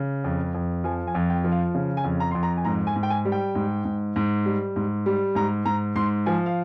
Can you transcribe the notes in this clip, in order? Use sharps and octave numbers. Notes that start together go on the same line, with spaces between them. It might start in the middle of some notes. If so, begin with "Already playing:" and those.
Already playing: C#3
F2
F2
F3 G#5
G#5
F2
G5
F3
F5
C#3
G#5
F2
A#5
F2 C6
A#5
G#5
G#2 A#5
G#5
G#2
G5
G#5
G3
G5
G#2
G#2
G#2
G3
G#2
G3
G#2 A#5
G#2 A#5
G#2 C6
F3 G#5
F5